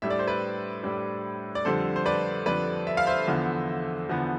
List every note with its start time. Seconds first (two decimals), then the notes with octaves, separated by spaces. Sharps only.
0.02 A2 G3 D4 E5
0.10 D5
0.19 C5
0.28 B4 D5
0.83 A2 G3 D4
1.55 D5
1.65 F2 D3 G3 D4 A4 C5
1.96 C5
2.06 B4 D5
2.46 F2 D3 G3 D4 B4 D5
2.87 E5
2.97 F5
3.07 C5 E5
3.28 E2 D3 F3 B3
4.09 E2 D3 F3 B3